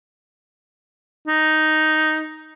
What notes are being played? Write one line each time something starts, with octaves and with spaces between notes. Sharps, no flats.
D#4